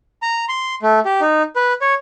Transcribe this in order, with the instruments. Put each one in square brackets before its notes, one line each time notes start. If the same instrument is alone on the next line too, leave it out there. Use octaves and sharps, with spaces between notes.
[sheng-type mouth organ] A#5
C6
A3
G4
D#4
B4
C#5